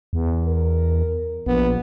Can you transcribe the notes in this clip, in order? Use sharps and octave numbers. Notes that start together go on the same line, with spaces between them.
E2
A#4
A#1 B3